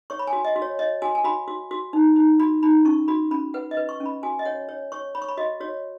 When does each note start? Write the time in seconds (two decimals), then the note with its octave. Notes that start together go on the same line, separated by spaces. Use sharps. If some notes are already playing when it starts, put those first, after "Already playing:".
0.10 C#5 C#6
0.19 B5
0.27 G#5
0.33 F#4
0.45 D#5
0.56 F#4
0.62 C#5
0.79 C#5 D#5
1.02 F#4 G#5
1.15 G#5
1.25 F#4 B5
1.48 F#4
1.71 F#4
1.93 D#4
2.16 D#4
2.39 F#4 B5
2.63 D#4 B5
2.85 C#4 C#6
3.08 F#4 B5
3.31 C#4 B5
3.54 B4 F#5
3.71 D#5
3.77 B4
3.89 C#6
4.00 C#4
4.06 B5
4.23 F#4 G#5
4.39 D#5
4.45 C#5 F#5
4.69 C#5
4.92 C#5 C#6
5.15 C#5 B5
5.22 C#6
5.28 B5
5.37 F#4 D#5
5.61 F#4 C#5